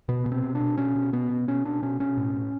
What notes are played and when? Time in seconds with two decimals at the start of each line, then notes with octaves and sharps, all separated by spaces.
0.09 B2 B3
0.26 B2
0.32 C4
0.43 B2
0.55 D4
0.60 B2
0.77 B2 C#4
0.96 B2
1.13 B2 B3
1.30 B2
1.48 B2 C#4
1.65 B2 D4
1.82 B2 C#4
2.00 B2 C#4
2.17 A2
2.35 A2